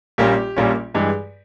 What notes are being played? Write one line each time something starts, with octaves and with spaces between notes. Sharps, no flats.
A#1 A#2 G3 A#3 C#4 G4
A#1 A#2 G3 A#3 C#4
G2 E3 G#3